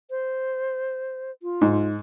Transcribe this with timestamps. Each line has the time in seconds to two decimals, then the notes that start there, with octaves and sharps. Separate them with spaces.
0.10 C5
1.43 F4
1.61 G#2